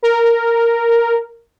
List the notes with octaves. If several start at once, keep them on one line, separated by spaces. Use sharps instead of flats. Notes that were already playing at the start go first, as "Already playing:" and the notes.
A#4